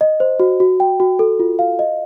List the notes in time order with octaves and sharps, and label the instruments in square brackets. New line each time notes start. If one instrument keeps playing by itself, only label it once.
[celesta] D#5
C5
F#4
F#4
G5
F#4
A4
F4
F5
D#5